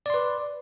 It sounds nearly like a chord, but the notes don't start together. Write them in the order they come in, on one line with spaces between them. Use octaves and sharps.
D5 C6 B4